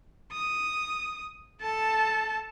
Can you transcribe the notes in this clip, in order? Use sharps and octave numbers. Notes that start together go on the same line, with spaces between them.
D#6
A4 A5